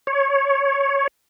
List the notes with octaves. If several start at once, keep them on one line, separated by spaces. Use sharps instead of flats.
C#5